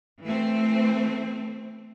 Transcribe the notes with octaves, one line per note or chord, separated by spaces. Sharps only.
E3 A3 C4